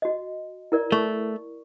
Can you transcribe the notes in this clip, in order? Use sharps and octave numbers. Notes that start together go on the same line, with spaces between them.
F#4 D#5
E4 A#4 D5
A3 C#6